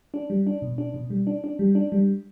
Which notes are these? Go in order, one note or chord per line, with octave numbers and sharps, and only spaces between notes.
D4
G3
D4
B2
D4
B2
G3
D4
D4
G3
D4
G3